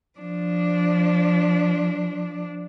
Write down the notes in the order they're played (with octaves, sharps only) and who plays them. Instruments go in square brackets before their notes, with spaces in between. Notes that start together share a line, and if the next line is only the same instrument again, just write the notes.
[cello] F3 D4